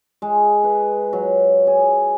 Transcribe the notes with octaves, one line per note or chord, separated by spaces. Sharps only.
G#3
B4
F#3
G#4